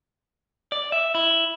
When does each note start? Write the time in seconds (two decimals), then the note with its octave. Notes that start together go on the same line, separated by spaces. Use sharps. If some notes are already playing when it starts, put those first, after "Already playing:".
0.72 D5
0.92 E5
1.15 E4